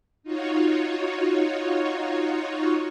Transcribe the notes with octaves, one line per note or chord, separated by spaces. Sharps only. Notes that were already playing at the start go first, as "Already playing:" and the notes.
D#4 F4 F#4 C#5